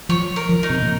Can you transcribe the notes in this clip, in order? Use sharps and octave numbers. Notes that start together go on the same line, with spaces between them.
F3 C#5
A#4
F3
D#4
C3
A#2